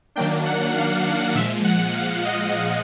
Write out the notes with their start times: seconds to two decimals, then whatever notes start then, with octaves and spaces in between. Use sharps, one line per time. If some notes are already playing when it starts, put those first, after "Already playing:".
0.16 D#3 F#3 A#3 D4 G5
0.46 F#5
0.76 F5
1.35 A#2 F3 G#3 E5
1.64 F#5
1.95 F5
2.25 D#5